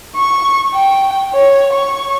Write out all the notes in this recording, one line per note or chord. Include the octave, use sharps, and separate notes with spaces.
C#6
G5
C#5
C#6